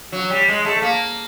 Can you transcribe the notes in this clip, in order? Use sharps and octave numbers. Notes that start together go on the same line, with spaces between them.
F#3
G3
G#3
A3
A#3